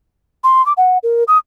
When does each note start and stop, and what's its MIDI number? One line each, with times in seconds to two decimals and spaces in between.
0.44 0.64 84
0.66 0.73 86
0.77 0.98 78
1.03 1.24 70
1.28 1.38 87